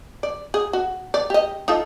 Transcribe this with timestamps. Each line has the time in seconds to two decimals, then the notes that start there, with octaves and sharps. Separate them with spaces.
0.23 D5
0.54 G#4
0.73 F#4
1.14 D5
1.30 G4 D#5
1.68 D#4 F4 A4